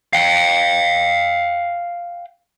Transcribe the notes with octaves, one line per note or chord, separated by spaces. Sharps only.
F5 G5